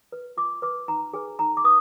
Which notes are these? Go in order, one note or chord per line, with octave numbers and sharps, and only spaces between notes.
B4
F4 D6
B4 D6
D#4 A#5
G#4 B4 G#5
D#4 A#5
D6
B4 D#6